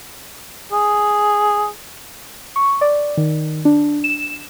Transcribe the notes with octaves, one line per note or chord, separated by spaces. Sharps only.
G#4
C#6
D5
D#3
D4
E7